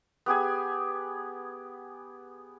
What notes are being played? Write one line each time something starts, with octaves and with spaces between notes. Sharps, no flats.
B3 G4 G#4 G#5